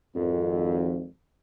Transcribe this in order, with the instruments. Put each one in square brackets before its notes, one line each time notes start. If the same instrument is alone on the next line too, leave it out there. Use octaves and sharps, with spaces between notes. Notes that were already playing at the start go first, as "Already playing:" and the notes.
[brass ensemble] G#1 F2